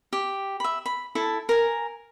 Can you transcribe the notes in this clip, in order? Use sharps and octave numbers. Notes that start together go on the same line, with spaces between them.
G4
E5 B5
B5
E4 A4 A5
A#4 G#5